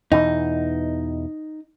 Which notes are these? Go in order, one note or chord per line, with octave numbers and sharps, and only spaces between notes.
E2 B2 E3 D#4